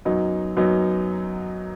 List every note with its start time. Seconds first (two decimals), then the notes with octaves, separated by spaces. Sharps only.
0.05 F#2 F#3 B3 D#4
0.57 F#2 F#3 B3 D#4